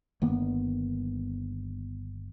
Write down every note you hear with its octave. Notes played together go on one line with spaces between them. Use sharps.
G1 D#3 A#3 B3